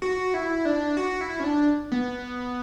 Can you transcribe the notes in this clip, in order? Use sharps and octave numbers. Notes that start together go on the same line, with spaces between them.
F#4
E4
D4
F#4
E4
C#4
D4
B3